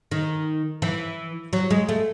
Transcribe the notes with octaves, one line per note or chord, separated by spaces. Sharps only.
D#3
E3
F#3
G#3
A3